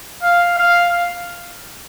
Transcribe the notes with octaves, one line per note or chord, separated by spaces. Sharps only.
F5
F5